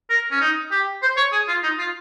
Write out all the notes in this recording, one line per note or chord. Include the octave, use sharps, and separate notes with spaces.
A#4
C#4
D#4
G4
C5
C#5
G#4
F4
D#4
F4